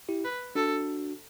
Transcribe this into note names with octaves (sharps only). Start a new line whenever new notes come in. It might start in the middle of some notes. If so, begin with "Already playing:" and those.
E4 G4
B4
D4 F#4 A4